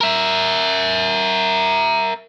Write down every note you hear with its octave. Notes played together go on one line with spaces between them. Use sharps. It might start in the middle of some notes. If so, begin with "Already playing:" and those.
A#4 E5